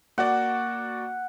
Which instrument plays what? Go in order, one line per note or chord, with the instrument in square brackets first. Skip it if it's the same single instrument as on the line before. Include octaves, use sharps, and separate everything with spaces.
[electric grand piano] A#3 F#4 D5 [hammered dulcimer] F#5